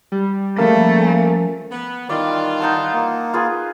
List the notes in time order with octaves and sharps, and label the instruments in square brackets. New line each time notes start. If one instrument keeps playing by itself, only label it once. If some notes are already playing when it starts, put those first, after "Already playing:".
[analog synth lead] G3
[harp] F3 C#4 A4 [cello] A3 [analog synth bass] A#3
[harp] G#5 A#5
[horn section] B3
[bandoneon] D#3 [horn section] E3 G3 F4 [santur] D5
[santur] D#4 F#5 A5
[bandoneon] A#3
[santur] F4 G#4 B4